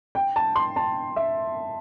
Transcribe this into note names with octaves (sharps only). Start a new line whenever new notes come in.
G5
A5
C6
A5
E5